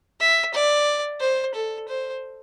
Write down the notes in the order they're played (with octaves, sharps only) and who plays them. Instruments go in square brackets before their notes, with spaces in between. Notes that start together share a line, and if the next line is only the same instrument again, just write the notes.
[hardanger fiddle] E5
D5
C5
A4
C5